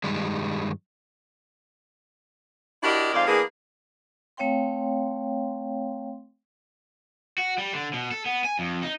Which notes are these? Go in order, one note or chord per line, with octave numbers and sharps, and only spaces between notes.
G2 D#3 G3 G#3
D4 E4 F#4 G4 A#4 D#5
F2 G#2 C5 D5 F5
E3 A#3 B3 D4 G#4
A3 C4 C#5 F5 G5 C6
F#4
G3
D3
B2
A4
B3
G#5
F2
D#4